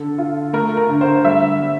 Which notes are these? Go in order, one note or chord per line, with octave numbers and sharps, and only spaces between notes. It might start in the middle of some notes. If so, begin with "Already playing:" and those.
Already playing: D3 A4
F4
A3 A#4
A#4
D3
C5
G3 E5
G3